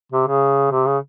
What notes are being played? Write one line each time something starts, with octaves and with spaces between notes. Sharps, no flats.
C3
C#3
C3
C#3